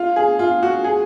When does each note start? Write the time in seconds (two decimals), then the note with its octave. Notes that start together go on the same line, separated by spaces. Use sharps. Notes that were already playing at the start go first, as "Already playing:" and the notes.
Already playing: F4
0.16 G#4
0.39 F4
0.63 F#4
0.84 G#4